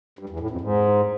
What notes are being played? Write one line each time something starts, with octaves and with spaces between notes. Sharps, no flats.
G2
E2
A2
F2
G#2